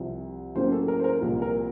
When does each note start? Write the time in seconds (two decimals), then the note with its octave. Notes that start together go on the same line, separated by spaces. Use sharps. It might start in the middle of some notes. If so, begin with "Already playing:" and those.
Already playing: C2 C3 F3
0.55 A2 F#3 A#3 C#4 C5
0.72 A4
0.88 A#4
1.00 C5
1.04 A#4
1.21 C2 A#2 F3
1.42 A#4